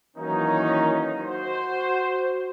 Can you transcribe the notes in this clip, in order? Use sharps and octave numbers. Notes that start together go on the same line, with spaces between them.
D#3 E3 F#3 A#3 C#4 D#4
F#4 C5